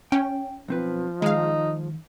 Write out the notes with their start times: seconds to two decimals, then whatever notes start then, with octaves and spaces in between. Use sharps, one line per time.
0.12 C#4 G5
0.68 B1 F3 C4 B4
1.22 D#3 G#3 D#4 F5